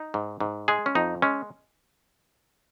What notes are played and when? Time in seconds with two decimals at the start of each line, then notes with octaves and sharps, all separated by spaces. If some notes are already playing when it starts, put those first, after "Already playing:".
Already playing: D#4
0.14 G#2
0.40 G#2
0.68 G#3 G#4
0.86 C#4
0.95 F2 D#4
1.22 G#3 C#4